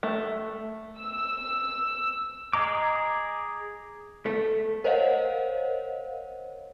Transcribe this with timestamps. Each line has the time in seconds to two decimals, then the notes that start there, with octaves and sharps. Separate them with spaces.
0.03 A3
0.99 E6
2.53 G#4 D#5 A#5 D6
4.26 A3
4.84 A#4 C5 C#5 D#5 F5 F#5